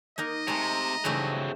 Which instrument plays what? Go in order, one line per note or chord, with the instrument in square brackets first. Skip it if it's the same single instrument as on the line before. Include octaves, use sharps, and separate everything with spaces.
[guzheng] A#3 D#4 A#4 [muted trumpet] D#5
[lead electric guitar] C3 [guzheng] G#3 A3 [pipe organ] A#5
[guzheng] G2 E3 A3 [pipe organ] C#3 [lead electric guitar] F#3 C4